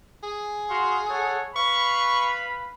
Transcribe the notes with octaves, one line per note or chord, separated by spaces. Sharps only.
G#4
F#4 F5 C6
A4 C#5 F#5
B4 F5 B5 C#6